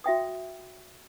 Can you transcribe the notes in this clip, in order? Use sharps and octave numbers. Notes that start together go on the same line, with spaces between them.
F#4 E5 G5 D#6